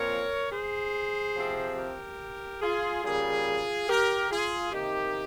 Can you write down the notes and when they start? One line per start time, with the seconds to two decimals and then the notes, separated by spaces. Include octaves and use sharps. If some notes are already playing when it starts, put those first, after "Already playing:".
Already playing: A#2 F3 C4 A#4 C#5
0.51 G#4 C5
1.36 C3 F3 C4
1.77 G4 A#4
2.62 F4 G#4
3.04 C#3 G3 A#3 F4 G#4
3.88 G4 A#4
4.30 F4 G#4
4.72 C3 D#3 A#3 D#4 G4